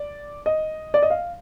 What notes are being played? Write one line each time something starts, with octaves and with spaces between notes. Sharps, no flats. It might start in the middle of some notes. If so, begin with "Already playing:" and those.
Already playing: D5
D#5
D5
D#5
F5